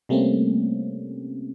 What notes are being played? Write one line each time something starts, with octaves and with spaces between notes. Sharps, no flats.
C3 G3 A3 A#3 C4 C#4